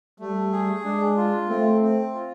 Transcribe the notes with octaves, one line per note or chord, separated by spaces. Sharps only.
G3 A3
G#4
G#3 D4
F4
A3 C4
C4
F4